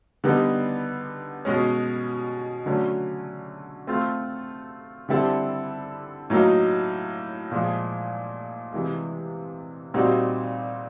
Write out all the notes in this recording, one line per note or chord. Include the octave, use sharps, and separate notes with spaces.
D3 G3 B3 D#4
B2 G#3 C#4
D3 F#3 A3 C#4
A3 C4 F4 A4
D3 G3 C4 E4 A4
A2 F#3 A#3 D#4
A#2 F3 G#3
C3 E3 G#3
A#2 G3 C4 D#4 F#4